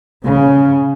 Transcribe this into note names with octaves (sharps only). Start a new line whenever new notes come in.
C#3